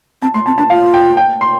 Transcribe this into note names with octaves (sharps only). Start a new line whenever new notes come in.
C4 A5
A3 C6
C4 A5
D4 A5
F4 F5
G5
G5
C6